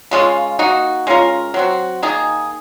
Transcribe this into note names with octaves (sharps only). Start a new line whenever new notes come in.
C#3 G#3 C#4 F4
A#3 D#4 F#4
G#3 C#4 F4 A#4
F#3 C4 F#4
D#3 A#3 D#4 G#4